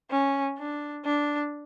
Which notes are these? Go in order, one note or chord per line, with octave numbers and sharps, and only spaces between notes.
C#4
D4
D4